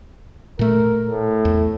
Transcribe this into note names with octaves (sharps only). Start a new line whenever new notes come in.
A#2 A3 A#4
A2
E2